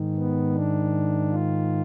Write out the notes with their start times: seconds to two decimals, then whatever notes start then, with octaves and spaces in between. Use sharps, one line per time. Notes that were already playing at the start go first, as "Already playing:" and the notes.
Already playing: G#2 D#3
0.16 B3
0.55 D4
1.31 F4